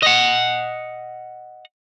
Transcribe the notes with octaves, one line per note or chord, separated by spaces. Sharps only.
D#5 F#5